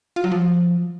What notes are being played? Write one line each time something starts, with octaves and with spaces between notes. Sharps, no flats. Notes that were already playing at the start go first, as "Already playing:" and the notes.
F4
F#3
F3